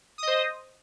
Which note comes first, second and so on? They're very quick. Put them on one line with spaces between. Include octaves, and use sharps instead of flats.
D#6 D#5 C5